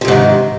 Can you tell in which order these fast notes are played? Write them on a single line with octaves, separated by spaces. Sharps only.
F3 C3 G#2 D#3